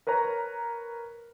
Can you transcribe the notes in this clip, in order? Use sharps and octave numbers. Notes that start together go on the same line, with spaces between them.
A#4 B4 C#5 A#5